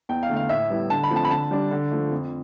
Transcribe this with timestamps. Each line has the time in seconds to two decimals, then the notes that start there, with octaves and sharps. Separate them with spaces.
0.09 E2 G5
0.23 F5
0.29 D3 A3
0.37 F5
0.49 A2 E5
0.70 G3 B3 E4
0.90 D3 A5
1.04 B5
1.10 F3 A3 C4
1.16 A5
1.25 B5
1.31 D3 A5
1.51 G3 D4
1.71 D3
1.91 F3 A3
2.12 F2